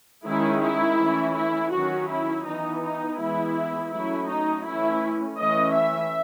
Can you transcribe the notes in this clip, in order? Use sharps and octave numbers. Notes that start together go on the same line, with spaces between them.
D#3 G#3 C#4 E4
E4
E3 A3 C#4
E4
D#3 F#3 C#4 F#4
E4
E3 B3 D#4
D#4
E3 G#3 B3 E4
F#3 A3 C#4 E4
D#4
E3 A3 C#4 E4
E3 A3 C#4 D#5
E5